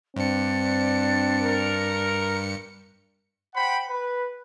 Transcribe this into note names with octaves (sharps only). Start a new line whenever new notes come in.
G2 C4 D4 C#7
A#4
C5 F#5 G5 B5
B4